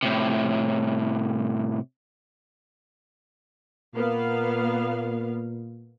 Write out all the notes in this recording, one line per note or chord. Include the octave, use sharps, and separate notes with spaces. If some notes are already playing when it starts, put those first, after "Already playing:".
A2 C3
A#2 A#3 B3 F5